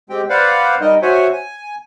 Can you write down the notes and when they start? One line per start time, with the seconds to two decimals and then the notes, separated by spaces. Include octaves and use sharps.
0.10 G#3 C4 G4 G5
0.30 B4 C5 D5 F5 F#5
0.81 G3 D#4 A#4 D#5
1.02 F#4 C5 C#5 E5 F#5 G#5
1.32 G#5